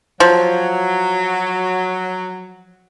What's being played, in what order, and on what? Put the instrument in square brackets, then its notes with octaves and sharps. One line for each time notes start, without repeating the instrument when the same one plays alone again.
[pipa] F3 [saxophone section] F#3